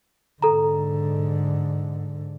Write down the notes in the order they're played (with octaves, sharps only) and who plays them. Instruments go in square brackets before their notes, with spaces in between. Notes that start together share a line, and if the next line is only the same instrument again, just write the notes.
[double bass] G#2 D3 [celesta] A4 A#5